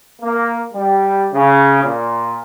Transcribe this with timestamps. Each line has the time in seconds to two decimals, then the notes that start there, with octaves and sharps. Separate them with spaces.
0.22 A#3
0.72 G3
1.32 C#3
1.83 A#2